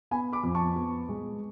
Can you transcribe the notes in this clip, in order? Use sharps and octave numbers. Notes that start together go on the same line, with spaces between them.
B3 G#5 B5
B5 D6
F2
A5 C#6
B3
G#3